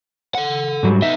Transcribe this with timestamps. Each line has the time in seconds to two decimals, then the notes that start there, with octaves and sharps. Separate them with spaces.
0.35 A4 F#5
0.83 G#2 F#3 G3
1.02 B3 D#4 E5